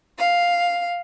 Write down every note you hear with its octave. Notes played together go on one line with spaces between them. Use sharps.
F5